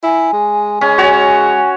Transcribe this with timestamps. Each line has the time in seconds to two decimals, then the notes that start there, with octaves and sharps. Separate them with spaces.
0.03 E4 G#5
0.33 G#3
0.81 G#3 C#4
0.98 F#4 C#5 G#5